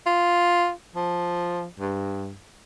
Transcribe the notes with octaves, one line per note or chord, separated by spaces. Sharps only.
F4
F3
G2